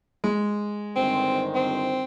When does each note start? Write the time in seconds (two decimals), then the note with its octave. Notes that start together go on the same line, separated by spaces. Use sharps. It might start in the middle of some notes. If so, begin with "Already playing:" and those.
0.24 G#3
0.96 G1 D#3 C4 C5
1.55 C4